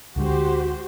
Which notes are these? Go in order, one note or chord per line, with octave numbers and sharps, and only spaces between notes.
D2 D3 G#3 F#4 G4 C5